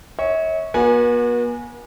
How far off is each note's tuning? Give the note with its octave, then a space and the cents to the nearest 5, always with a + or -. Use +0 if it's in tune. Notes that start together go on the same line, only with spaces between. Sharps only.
C#5 +0 E5 -45
B3 -45 F#4 -25 G#5 +0